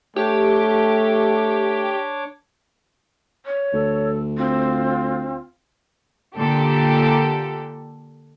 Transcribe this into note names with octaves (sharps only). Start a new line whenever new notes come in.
A3 D4 G4 C#5 D6
C#5
D2 A4
C4 F4
A#2 D3 G4 A4